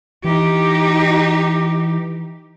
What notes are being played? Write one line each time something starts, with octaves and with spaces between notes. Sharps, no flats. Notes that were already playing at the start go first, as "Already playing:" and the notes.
E3 D#4 G4